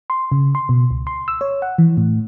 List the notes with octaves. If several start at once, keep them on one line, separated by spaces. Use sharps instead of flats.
C6
C#3
C6
B2
C#2
C6
E6
C#5
F#5
E3
A2